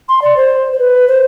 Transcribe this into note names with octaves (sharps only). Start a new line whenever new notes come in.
C6
D5
C5
C5
B4
C5